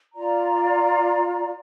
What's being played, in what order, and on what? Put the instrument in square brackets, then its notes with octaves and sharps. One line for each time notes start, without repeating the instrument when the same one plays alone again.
[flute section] F4 D5 A#5